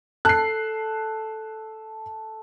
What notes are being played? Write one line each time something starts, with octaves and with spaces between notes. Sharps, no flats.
A4 F#6 C7